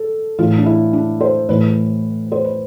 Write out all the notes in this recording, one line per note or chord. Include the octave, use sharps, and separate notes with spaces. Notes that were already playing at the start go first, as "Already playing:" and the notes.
Already playing: A4
A2 E3 F4
D4
E4
D4
C5
A2 E3 B4
C5
B4